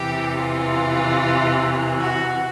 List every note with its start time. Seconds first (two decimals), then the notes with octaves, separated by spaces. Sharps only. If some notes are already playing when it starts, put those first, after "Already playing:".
Already playing: E2 C3 E3 G4
0.38 F4
1.99 F#4